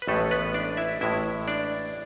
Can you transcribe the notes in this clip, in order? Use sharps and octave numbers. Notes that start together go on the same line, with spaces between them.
B4
A1 A2 G#3 A3 A4
B3 B4
D4 D5
E4 E5
A1 A2 G#3 E4 E5
D4 D5